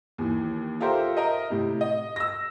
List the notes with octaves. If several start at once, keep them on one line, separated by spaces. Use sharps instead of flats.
D#2 E3
F4 G4 A4 A#4 C5 E5
A#4 D#5 E5
A2 C3
D#5
E6 A#6